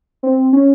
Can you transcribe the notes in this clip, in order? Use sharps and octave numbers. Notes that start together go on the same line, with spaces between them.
C4
C#4